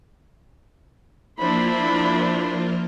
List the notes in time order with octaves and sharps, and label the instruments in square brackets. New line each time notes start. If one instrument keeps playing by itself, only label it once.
[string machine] F3 A#3 F4 [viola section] D4 E4 C5 [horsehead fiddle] B5